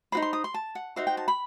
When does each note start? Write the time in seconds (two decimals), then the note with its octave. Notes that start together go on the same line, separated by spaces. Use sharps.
0.12 D#4 F#4 C5 B5
0.22 C6
0.33 D#6
0.44 C6
0.54 A5
0.75 F#5
0.96 D#4 F#4 C5 E5
1.07 G5
1.17 A5
1.28 B5